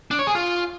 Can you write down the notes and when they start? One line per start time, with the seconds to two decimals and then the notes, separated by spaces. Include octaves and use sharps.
0.11 D4
0.19 C#5
0.27 G#4
0.35 F4